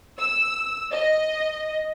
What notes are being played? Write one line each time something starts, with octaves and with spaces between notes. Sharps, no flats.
E6
D#5